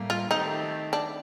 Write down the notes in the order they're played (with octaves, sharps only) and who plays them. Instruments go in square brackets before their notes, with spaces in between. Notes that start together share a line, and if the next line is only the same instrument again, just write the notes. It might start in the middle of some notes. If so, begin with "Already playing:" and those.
Already playing: [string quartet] A2 G3 A#3
[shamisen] F4
[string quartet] D#3 A3 C4 G4 [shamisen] D#4
[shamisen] D4